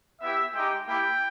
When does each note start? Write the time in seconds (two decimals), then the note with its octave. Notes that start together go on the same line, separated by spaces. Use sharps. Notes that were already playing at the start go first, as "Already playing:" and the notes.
0.21 B3 E4 G4 E5
0.53 G#3 D#4 G4 G5
0.85 A#3 E4 G4 G5